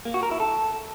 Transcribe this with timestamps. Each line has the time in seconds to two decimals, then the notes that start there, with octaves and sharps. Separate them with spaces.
0.05 A#3
0.14 F#4
0.23 A#4
0.31 E4
0.40 A4